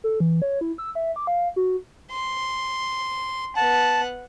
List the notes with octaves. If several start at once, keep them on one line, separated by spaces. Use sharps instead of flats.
A4
E3
C#5
E4
E6
E5
D6
F5
F#4
C6
B3 F#5 A5